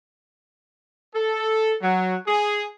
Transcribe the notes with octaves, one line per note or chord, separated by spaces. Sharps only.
A4
F#3
G#4